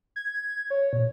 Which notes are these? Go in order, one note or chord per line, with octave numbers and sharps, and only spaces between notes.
G#6
C#5
A#2